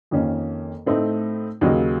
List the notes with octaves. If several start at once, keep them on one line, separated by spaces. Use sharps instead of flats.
F2 D#3 A#3 C#4
A2 A3 C4 D#4
D#2 C#3 F#3 A#3 D#4